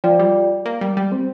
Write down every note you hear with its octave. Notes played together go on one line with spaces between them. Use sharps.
F3 F4 D5 G5
G3
A#3
G3
G3
C4